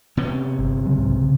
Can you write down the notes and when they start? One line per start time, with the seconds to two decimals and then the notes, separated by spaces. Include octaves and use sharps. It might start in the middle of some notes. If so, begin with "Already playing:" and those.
0.17 C3 B3 C#4
0.58 G1
0.85 C#3 F#3 G3
0.98 B1 G#2 F#3
1.21 C#3